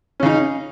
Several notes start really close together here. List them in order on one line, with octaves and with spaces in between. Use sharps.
C#4 C#3 D#4